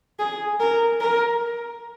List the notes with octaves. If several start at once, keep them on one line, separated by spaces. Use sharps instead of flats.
G#4
A#4
A#4